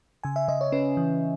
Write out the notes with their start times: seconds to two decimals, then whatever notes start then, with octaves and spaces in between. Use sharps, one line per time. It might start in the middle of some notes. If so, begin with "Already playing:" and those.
0.24 C#3 G#5
0.36 E5
0.48 C#3 D#5
0.61 C#5
0.72 C#4 B4
0.97 E3